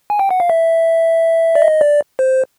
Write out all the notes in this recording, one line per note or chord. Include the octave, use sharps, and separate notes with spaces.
G#5
G5
F#5
F5
E5
D5
D#5
D5
C5